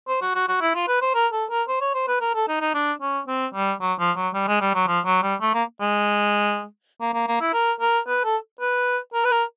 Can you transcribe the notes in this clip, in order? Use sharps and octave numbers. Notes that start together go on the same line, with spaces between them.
C5
F#4
F#4
F#4
E4
F4
B4
C5
A#4
A4
A#4
C5
C#5
C5
B4
A#4
A4
D#4
D#4
D4
C#4
C4
G3
F#3
F3
F#3
G3
G#3
G3
F#3
F3
F#3
G3
A3
A#3
G#3
A#3
A#3
A#3
E4
A#4
A#4
B4
A4
B4
A#4
B4
A#4